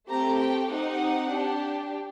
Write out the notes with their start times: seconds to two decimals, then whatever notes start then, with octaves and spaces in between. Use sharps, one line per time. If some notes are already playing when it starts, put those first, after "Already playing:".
0.09 A3 C4 G4 A#5
0.39 G5
0.69 C4 D#4 G4 F#5
1.29 D4 G4